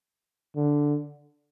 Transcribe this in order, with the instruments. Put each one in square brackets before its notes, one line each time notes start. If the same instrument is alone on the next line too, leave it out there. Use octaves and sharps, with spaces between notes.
[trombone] D3